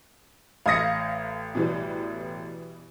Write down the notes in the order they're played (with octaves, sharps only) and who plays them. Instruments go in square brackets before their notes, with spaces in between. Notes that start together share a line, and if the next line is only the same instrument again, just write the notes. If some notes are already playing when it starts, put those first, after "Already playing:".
[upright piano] A1 D#6 C#7 [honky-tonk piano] F5 G#6 A#6
[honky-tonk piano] B2 E3 G3